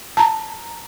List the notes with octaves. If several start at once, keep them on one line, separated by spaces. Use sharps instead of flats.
A5 A#5